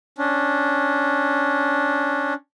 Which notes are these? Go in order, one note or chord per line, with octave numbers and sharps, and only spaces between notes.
C#4 D4